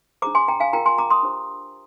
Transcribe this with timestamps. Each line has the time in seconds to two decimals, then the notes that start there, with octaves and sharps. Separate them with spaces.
0.22 D4 G#4 C5 A#5 D6
0.35 G#5 C6
0.48 G5 A#5
0.60 F5 G#5
0.73 F4 A#4 G5 A#5
0.86 G#5 C6
0.98 A#5 D6
1.10 C6 D#6
1.23 D4 G4 C5